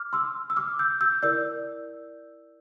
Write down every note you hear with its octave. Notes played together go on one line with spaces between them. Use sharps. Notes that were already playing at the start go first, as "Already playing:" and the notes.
Already playing: D6 F6
C6 E6
E6
D6 F6
E6 G6
E6 G6
E4 A#4 D5 E6 G6